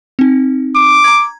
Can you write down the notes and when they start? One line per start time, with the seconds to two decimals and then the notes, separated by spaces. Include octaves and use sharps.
0.19 C4 D#4
0.75 D6
1.04 A#5 G#6